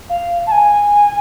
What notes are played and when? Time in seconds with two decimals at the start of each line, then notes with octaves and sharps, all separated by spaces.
0.09 F5
0.47 A5
0.51 G#5